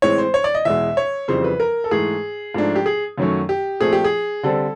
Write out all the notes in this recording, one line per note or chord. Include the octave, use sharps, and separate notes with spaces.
A2 E3 G#3 C4 C#5
C5
C#5
D5
D#5
E2 B2 G#3 E5
C#5
F2 C#3 E3 G3 C4 C5
B4
A#4
A4
G#2 E3 A3 G#4
G#2 F3 A3 D4
G4
G#4
F#2 D#3 F#3 A3 C#4
G4
A#2 F3 A3 C4 G#4
G4
G#4
D3 G3 C4 A4